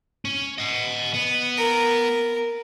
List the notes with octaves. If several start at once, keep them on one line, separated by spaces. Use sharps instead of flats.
C#4
D#5 F#5
B3
A#4